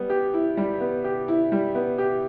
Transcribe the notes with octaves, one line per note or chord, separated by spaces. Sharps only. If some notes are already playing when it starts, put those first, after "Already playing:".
Already playing: G3 B3
G4
E4
G3
B3
G4
E4
G3
B3
G4